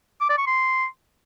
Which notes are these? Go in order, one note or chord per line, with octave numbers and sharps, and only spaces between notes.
D6
D5
C#6
C6